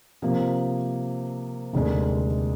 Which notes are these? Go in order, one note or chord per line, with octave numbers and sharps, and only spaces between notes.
C3 F3 A#3
F1 D#2 D3 G#3